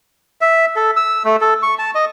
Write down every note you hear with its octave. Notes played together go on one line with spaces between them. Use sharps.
E5
A4
E6
A3
A4
C#6
A5
D#5